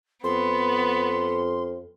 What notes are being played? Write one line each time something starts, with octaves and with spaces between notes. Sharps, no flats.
F2 B3 C6